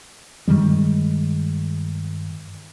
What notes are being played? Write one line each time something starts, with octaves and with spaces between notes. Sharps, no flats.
G2 D#3 G3 G#3